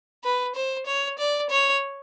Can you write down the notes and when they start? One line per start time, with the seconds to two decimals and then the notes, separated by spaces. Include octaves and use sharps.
0.24 B4
0.55 C5
0.86 C#5
1.19 D5
1.50 C#5